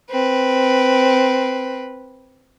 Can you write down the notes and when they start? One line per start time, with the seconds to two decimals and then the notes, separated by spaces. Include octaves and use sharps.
0.10 C4 B4